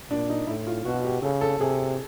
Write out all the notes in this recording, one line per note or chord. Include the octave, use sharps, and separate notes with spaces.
A#2 D4
D#4
A2 E4
F4
B2 F#4
G4
C#3 A4
A4
C3 G#4